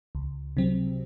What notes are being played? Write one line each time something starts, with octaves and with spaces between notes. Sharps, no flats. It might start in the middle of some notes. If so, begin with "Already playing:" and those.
C#2
C3 F#3 C4